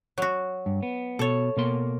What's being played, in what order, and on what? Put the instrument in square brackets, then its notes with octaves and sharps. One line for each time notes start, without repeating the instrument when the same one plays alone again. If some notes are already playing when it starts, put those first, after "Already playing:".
[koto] F#3 F#4
[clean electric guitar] G2
B3
[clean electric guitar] B2 [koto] A4 C#5
[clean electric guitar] B2 A#3 C6